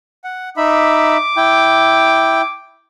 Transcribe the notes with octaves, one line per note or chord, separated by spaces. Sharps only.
F#5
D#4 E5 B5 D6
E4 G5